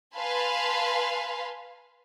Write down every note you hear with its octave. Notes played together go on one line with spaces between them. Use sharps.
B4 F5 G#5 A5 B5 C6